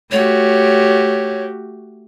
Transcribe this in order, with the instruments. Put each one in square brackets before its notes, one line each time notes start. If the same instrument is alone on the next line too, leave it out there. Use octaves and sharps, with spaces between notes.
[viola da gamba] A3 F#4 G4 [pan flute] C#5